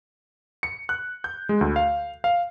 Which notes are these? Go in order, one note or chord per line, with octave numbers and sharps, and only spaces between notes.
C#7
F#6
G6
G#3
D2
F5
F5